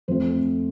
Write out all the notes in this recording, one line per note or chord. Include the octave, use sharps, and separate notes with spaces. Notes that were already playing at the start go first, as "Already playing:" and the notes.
F2 F3 A3 C4 C5